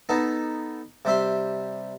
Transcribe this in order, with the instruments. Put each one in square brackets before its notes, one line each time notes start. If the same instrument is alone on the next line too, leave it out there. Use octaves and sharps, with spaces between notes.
[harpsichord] B3 D#4 A4
C3 G3 E5 C6